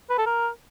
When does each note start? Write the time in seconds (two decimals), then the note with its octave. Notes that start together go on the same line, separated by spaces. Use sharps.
0.10 B4
0.18 A4
0.26 A#4